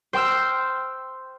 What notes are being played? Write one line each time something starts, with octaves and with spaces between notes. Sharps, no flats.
C5 G5 C6 E6 F6